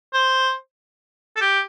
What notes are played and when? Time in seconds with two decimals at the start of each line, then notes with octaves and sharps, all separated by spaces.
0.13 C5
1.36 A4
1.41 G4